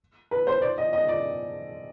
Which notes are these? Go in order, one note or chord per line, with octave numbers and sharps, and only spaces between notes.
B4
C5
D5
D#5
D#5
D5